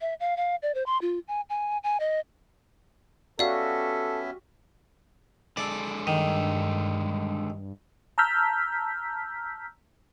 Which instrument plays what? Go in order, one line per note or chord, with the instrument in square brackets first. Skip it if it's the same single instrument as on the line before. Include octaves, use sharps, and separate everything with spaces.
[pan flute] E5
F5
F5
D5
C5
C6
F4
G#5
G#5
G#5
D#5
[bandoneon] B3 C#4 E5 [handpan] F#4 G4 [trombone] A4 [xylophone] D5 F5
[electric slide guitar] D3 G#3 A4 [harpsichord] D5
[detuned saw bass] G2 [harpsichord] D#3
[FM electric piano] A5 A#5 E6 F6 G6 B6